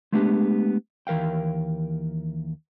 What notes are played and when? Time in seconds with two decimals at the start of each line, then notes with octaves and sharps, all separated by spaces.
0.12 G#3 A3 B3 D4 G4
1.07 D#2 E3 A#4 F5 G5